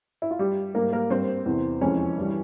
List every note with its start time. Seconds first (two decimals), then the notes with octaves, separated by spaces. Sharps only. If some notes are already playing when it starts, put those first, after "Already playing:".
0.22 E4
0.31 F4
0.39 G2 G3 G4
0.75 G#2 G3 A#3 A#4
0.92 A#3 A#4
1.10 G2 G3 C4 C5
1.46 E2 C3 E3
1.81 F2 E3 G#3 C#4 C#5
2.17 G2 E3 G3